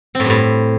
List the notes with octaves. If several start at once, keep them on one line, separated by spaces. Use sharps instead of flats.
C4
A2
G2
A2